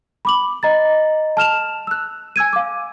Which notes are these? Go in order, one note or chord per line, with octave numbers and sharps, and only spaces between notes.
B5 D6 F#7
D#5 A#5 A6
A5 F6 E7 F7
E6 F#6
G#5 E6 G#6 D#7
F5 D6